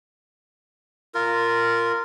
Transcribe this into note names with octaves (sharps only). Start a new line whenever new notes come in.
F4 A#4